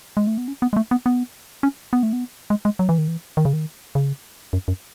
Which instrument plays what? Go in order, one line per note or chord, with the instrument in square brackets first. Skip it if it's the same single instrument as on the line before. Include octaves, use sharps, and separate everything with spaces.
[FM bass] G#3
A3
B3
C#4
B3
G#3
A3
B3
B3
C#4
B3
A3
B3
G#3
G#3
F#3
E3
D#3
E3
D#3
C#3
D#3
C#3
F#2
F#2